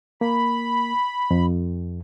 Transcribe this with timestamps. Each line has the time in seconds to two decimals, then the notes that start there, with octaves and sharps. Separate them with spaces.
0.21 A#3 B5
1.31 F2